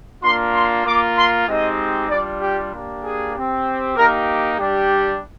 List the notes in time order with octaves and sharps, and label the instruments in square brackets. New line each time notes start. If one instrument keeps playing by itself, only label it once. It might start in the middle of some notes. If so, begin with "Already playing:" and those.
[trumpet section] A#3 D4 F4 C6
C6
A#3 F4 D6
C6
G#3 C4 D#4 G4 D#5
G3 D4 F4 D5
G4
A#3 D4 G4
G#4
C4 G4
A#3 D#4 G4 A#4
G3 D4 G4